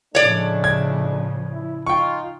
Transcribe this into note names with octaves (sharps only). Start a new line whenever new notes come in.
A2 C#3 F3 G#3 A3 D4 C#5 D5
G#6
E4
D#4 F4 G5 C#6